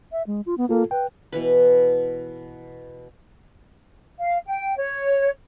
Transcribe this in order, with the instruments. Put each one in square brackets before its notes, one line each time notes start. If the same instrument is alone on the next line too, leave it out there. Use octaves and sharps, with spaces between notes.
[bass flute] E5
G#3
F4
B3
[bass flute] A#3 [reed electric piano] F4 A4
[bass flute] B4 [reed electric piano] G5
[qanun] B2 E3 B4
[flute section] F5
G5
C#5